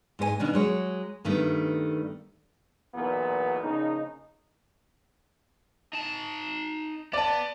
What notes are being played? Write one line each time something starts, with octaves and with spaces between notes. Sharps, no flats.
G#2 G#4 C5 G#5
B2 D#3 C#4 D4
F#3 G#3 C#5
G2 D#3 G3 A3 B3
B1 E2 A#2 A#3 B3
A#1 C#3 D#4
D#4 A5
B3 D5 A5